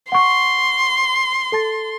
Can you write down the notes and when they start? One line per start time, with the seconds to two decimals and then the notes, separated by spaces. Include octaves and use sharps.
0.12 F#5 C6 C#6
1.52 A4 A5 A6